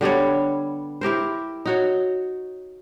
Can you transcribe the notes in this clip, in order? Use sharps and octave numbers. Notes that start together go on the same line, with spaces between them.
D3 G3 B3 C#5
E4 G4 A#4 C5
D#4 F#4 C#5